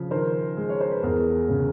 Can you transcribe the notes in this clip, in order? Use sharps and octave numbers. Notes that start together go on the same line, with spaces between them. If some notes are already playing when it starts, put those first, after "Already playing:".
Already playing: C#3 F3
D#3 A#4 C5
G#3
C#5
C5
B4
E2 G#4 A#4
C#3